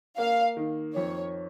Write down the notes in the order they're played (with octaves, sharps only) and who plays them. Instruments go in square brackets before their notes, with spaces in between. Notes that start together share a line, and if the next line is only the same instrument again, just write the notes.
[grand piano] A#3 [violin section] F5
[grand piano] D#3
[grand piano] F2 [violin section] C#5